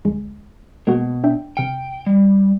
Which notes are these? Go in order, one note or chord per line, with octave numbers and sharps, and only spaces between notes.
G1 D2 G#3
B2 G#3 A#3 F#4
D4 E5 G5
C3 G5 F6 C#7
G3